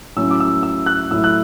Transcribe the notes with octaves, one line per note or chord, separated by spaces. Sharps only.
A2 F#3 C#4 E4 E6
D6
E6
E6
F#6
A2 F#3 A3 E4 E6
F#6